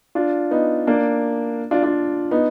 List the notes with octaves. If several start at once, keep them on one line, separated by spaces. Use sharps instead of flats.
D4 F4
B3 D#4
A#3 D4
D4 F4
D4 F4
B3 D#4